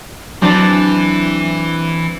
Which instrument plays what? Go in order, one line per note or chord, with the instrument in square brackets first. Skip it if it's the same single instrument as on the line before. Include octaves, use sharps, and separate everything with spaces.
[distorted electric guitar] E3 [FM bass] F#3 [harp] C4 D4 A5